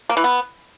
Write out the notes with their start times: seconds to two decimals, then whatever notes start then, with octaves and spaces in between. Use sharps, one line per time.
0.09 A#3
0.17 E3
0.24 B3